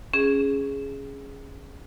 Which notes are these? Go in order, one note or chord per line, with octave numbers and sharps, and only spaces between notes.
C#4 G#4